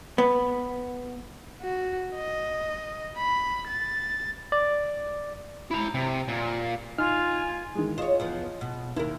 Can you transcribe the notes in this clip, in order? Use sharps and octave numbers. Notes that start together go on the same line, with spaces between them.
B3
F#4
D#5
B5
A6
D5
E4 A#5
C3
A#2
D#4 F4 G#5 F6
D#3 E3 G#3
F4 G#4 C5 C#5 D#5
E2 F3 B3
B2
D#2 E4 A#4